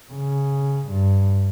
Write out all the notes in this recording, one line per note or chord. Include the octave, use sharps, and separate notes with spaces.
C#3
G2